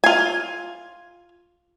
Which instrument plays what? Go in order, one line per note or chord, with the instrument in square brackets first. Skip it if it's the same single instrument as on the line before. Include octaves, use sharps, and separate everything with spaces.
[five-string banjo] F4 G#5